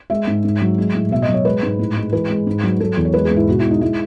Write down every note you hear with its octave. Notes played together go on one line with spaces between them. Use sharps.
G#3 E5
G#2
G#2
F#3
G#3
A2
B2 E5
D#5
F#3
C#5
G#3 B4
G#2
A2
G#3
E3 B4
G#3
G#2
F#3
F#3 A4
E2
C#5
G#3 B4
G#4
G#2
E4
B2 F#4
E4
G#3
D#4
G#3 E4